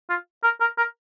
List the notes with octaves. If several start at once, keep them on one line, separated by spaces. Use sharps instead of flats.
F4
A#4
A#4
A#4